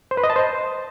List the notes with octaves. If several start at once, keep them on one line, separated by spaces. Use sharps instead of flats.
C5
B4
D#5
A5
C5